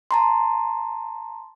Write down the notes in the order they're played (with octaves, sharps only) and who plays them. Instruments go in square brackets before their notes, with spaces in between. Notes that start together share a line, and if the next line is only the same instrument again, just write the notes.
[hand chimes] A5 A#5 C6